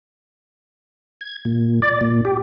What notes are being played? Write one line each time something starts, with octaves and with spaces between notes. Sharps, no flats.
G#6
A#2
D5
A#2
G4